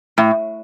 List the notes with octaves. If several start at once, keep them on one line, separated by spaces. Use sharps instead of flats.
A2